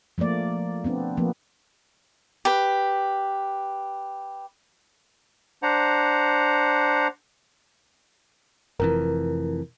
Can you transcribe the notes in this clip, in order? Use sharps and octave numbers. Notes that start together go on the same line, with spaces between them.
F3 A3 A#3 D5
B3 C4 D4
F3 A#3 B3
G4 B4
D4 C5 F#5 A#5
F1 F2 E3 A#4